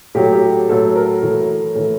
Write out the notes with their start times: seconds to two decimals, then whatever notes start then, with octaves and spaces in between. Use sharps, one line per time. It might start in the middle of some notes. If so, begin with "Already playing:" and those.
0.14 A2 F#3 G4
0.33 G4
0.69 A2 F#3 A4
0.95 A#4
1.22 A2 E3
1.75 A2 E3